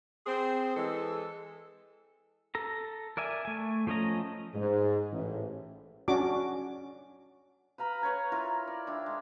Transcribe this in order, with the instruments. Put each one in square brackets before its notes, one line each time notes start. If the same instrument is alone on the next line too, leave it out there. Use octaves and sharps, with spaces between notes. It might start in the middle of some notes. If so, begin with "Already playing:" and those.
[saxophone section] C4 G#4 C5
E3 G#3 A4
[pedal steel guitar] A4 A#5
A#4 D5 E5 G#5
A3 G#5
F3 A3 C#4 D#5 A#5
[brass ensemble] G#2
A1
[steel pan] C#4 D4 F#4 D6
[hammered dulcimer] B4 F5 A#5 B5
B4 C#5 G#5 A#5
E4 F4 A#4
D5
D#3 D4 E4
G#3